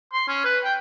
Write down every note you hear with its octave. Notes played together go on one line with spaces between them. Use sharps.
C6
C#4
B4
G5